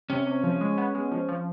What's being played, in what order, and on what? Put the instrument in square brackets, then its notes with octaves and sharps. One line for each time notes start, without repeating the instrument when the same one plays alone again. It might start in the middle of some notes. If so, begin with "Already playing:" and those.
[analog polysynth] C3 [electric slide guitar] C#4
[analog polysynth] C3
F3
G#3
B3
G#3
F3
F3